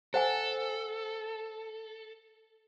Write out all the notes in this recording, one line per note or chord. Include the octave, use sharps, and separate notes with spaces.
A4 C5 F#5 G#5